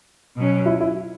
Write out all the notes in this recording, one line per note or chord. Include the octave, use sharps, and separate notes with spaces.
B2 F#3 C#4
E4
E4